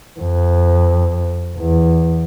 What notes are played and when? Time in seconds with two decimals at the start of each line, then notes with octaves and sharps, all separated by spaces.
0.20 F2
1.57 E2